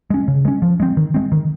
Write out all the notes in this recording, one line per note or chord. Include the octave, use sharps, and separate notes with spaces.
G#3 C#4
C#3
G#3 C#4
F3
G#3 C4
D#3
G#3 C4
D#3